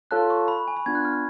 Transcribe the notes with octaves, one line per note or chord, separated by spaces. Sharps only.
F4 A4 C#5 F5 A5 F#6
C#6
B5
G#5
B5
B3 D4 F4 G#6
F#6
F6